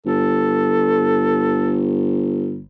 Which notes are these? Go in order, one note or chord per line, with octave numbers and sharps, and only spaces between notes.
G1 A4